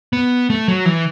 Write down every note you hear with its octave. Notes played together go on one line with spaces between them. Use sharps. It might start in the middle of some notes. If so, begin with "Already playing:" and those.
B3
A3
F#3
E3